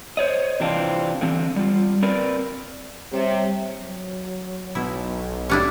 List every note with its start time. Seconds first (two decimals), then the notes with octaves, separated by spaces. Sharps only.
0.17 C5 C#5 D#5
0.60 C3 E3 C4 D4 F4
1.21 D3 E3 C4
1.56 G3 F4
2.02 C4 A#4 B4 D5
3.12 C3 G3 C#5 E5
3.78 F#3
4.75 B1 E4
5.50 C#4 D4 E4 G4